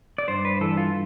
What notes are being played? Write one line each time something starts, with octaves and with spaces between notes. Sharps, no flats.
D5
G2 C5
B4
E3 A4
F4